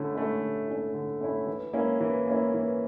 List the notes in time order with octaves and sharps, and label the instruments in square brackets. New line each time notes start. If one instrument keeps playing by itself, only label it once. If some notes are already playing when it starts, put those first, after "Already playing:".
Already playing: [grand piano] D3 A3 C#4 E4
A3 C#4 E4
D3
A3 C#4 E4
D3
A3 C#4 E4
E3
A#3 C#4 E4
E3
A#3 C#4 E4
E3